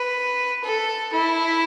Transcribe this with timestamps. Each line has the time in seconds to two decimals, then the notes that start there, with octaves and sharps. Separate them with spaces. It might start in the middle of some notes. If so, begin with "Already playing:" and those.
Already playing: B4
0.64 A4
1.13 E4